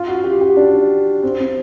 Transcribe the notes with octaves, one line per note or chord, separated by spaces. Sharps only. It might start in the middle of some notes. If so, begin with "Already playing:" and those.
Already playing: F4
F#4
G4
G4
D4
C4
C4